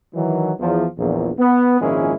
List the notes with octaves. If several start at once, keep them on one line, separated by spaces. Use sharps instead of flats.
D#3 E3 F#3
E2 F3
A#1 E2 A#2
B3
G#1 A#2 F3 G#3 C#4 E4